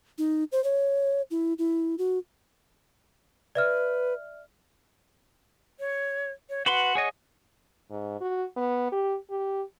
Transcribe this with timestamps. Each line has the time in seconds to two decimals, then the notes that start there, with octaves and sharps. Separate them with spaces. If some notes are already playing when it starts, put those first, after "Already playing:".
0.18 D#4
0.52 C5
0.64 C#5
1.31 E4
1.59 E4
1.98 F#4
3.55 B4 D5 E5 F6
5.80 C#5
6.50 C#5
6.66 F#4 B4 F#5 C6
6.95 G#4 C#5 D#5
7.91 G#2
8.21 F#4
8.56 B3
8.92 G4
9.30 G4